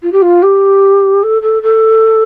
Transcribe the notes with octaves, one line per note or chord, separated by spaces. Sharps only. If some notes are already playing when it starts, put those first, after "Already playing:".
F4
G4
F4
G4
A4
A4
A4